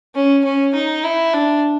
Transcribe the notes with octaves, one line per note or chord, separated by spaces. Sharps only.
C#4
C#4
D#4
E4
D4